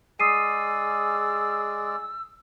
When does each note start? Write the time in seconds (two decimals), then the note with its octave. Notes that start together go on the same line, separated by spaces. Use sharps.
0.20 G#3 G#4 D5 D#6 E6 C7 D#7